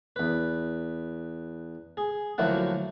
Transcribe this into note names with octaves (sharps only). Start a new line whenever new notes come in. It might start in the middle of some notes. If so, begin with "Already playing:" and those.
E2 B4
G#4
D2 F3 F#3 A#3 E4 F#5